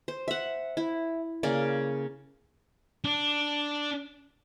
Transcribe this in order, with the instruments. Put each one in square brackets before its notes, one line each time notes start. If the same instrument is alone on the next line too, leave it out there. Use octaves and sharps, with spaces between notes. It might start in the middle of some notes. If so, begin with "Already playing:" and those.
[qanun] C5
E5 F#5
E4
C#3 A#3 D5
[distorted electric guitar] D4